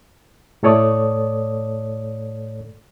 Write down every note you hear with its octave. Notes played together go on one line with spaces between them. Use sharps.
A2 A3 A4 C#5 D5 D#6